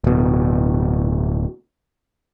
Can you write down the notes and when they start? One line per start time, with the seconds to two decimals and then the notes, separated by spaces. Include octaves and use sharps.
0.04 D1 B2